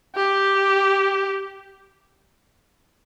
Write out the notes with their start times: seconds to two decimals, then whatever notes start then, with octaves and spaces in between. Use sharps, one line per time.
0.16 G4